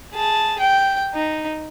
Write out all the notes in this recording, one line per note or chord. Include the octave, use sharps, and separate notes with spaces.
G#4 A5
G5
D#4